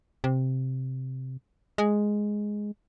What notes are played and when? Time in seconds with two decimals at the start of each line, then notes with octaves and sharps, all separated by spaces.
0.24 C3
1.78 G#3